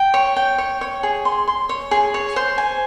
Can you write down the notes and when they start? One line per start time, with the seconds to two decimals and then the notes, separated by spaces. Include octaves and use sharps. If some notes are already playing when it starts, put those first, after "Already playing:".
Already playing: G5
0.14 C#5
0.36 G5
0.58 C#5
0.81 C#5
1.03 G#4
1.25 C6
1.47 C6
1.69 C#5
1.91 G#4
2.14 C#5
2.36 C5
2.58 G#5